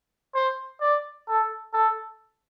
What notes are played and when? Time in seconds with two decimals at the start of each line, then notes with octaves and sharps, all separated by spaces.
0.35 C5
0.81 D5
1.28 A4
1.74 A4